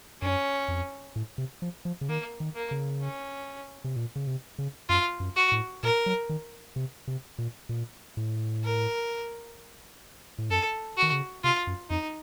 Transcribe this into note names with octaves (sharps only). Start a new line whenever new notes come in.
F#2 C#4
F2
A2
C3
F3
F3
C#3
D#3 A#3
D#3
A#3
C#3
C#4
C3
A#2
C#3
C3
C#3
F#2 F4
F#2
F#4
A2
A#2 A#4
F#3
D#3
C3
C3
A#2
A#2
A2
A#4
A2
F#2 A4
F#4
D#3
C#3
C3 F4
F#2
F2 D#4